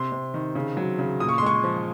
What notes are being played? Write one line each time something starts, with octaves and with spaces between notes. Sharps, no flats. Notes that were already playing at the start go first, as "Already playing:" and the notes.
Already playing: C3 C6
C3
D#3
C#3
F#3
C#3
A#2 D#6
C#6
C6
G#3 C#6
F3